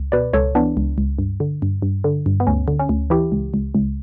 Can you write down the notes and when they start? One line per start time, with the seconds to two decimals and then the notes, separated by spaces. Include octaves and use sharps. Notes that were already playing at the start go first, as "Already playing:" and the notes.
Already playing: C#2
0.12 B2 B4 D5
0.33 C#2 A4 C#5
0.55 E3 B3 D4
0.77 C#2
0.98 C#2
1.19 G2
1.40 D3
1.62 G2
1.82 G2
2.04 D3
2.26 G2
2.40 B3
2.47 D2 C#4
2.68 D3
2.79 C#4
2.89 D2
3.10 E3 E4 G4
3.32 C#2
3.54 C#2
3.75 C#2